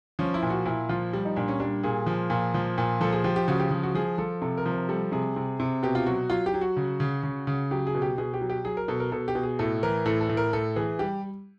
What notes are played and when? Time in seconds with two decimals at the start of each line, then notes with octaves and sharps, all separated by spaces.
0.19 F3 C#4
0.34 E4
0.42 A#2
0.50 F#4
0.65 A#2 E4
0.89 F3 F4
1.13 G3
1.25 D#4
1.36 A#2 D4
1.48 C#4
1.60 G3 D4
1.83 A#2 G#4
2.06 F3
2.30 A#2
2.54 F3
2.78 A#2
3.01 F3 A4
3.12 G#4
3.24 F3 G4
3.36 G4
3.48 C#3 F#4
3.59 G4
3.71 F3
3.83 F#4
3.95 F3 G#4
4.18 F3 A4
4.42 C3 A4
4.58 A#4
4.66 F3
4.73 A#4
4.89 G3 A4
5.12 C3 G#4
5.36 C3
5.60 C3
5.83 B2 G4
5.95 F4
6.06 F#3 F#4
6.30 F#3 F4
6.46 G4
6.54 F#3
6.61 F#4
6.76 C#3
7.00 C#3
7.23 C#3
7.47 C#3
7.71 F#3 G4
7.87 G#4
7.94 B2
8.02 G4
8.18 B2 G#4
8.34 G4
8.41 F#3
8.49 G4
8.64 F#3 G#4
8.77 A#4
8.88 B2 A4
9.00 A#4
9.12 B2 A4
9.28 G4
9.35 B2
9.43 G#4
9.59 A2 A4
9.83 E3 A#4
10.06 A2 A4
10.21 A4
10.29 A2
10.37 A#4
10.53 A2 A4
10.76 E3 G#4
10.99 G3 G4